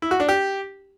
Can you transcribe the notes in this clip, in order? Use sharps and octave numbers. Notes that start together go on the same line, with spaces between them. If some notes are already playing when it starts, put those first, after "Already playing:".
E4
F#4
D4
G4